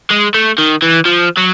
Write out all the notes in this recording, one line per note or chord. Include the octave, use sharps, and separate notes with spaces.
G#3
A3
D#3
E3
F3
F#3